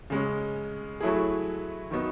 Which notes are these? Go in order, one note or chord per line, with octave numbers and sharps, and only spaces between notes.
C#3 G#3 C#4
F#3 A3 E4 G#4
D#3 F#3 B3 D#4